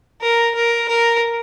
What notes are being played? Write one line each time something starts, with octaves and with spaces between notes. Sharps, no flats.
A#4
A#4
A#4